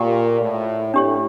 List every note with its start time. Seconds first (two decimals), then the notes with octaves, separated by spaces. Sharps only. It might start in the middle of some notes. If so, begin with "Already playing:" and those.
Already playing: A#2 G4 A#4 G5
0.40 A2
0.94 A2 D4 G4 C#5